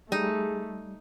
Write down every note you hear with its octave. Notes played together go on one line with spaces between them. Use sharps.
G3 A3 D#4 G#4